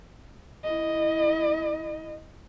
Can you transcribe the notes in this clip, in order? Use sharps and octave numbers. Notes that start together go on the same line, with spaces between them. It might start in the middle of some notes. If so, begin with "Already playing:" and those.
E4 D#5